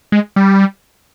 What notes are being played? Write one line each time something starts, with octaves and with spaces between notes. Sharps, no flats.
G#3
G3